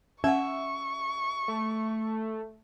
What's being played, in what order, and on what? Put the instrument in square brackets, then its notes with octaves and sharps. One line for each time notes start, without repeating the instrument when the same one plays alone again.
[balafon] C#4 F#5 [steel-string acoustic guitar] E5 [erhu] C#6
[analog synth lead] A3